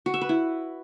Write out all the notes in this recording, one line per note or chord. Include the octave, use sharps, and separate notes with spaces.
F#4
E5
B4
E4